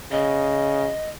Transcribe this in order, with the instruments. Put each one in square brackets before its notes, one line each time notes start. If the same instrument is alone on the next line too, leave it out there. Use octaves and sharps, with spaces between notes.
[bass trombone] C#3 [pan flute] D#5